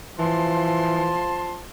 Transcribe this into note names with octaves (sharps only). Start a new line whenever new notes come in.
E3 F3 A5 C6